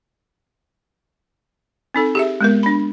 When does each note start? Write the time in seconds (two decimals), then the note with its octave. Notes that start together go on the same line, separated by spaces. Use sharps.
1.94 C4 D#4 A4
2.15 G4 G#4 E5
2.41 G#3 B3 A#4
2.63 D4 B5